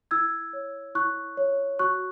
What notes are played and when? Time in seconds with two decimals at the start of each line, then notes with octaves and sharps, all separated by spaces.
0.11 E4 E6 G#6
0.53 C#5
0.95 E4 C#6 F#6
1.37 C#5
1.79 F#4 C#6 F#6